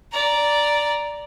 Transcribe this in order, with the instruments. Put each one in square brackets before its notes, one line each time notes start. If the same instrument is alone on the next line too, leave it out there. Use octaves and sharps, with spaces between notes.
[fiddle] D5 A#5